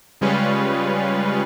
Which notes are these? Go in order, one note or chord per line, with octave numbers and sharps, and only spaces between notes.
C#3 G3 G#3 C#4 F4 B4